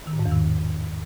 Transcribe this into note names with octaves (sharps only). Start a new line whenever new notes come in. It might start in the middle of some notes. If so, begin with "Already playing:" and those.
D#3
A2
G#2
E2
D#3